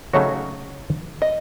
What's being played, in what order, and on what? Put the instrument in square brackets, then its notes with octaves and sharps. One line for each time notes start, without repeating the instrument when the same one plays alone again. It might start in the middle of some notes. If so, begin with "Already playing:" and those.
[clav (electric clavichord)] C#3 F#3 A3 D#4 F#4 [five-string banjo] C#5
[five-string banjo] D#5